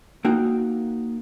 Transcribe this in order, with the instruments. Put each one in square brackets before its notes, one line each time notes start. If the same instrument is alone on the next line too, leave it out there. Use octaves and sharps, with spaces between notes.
[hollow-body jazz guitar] A#3 D#4 F#4 G5